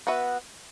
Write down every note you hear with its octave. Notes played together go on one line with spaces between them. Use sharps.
B3 F#4 B4 E5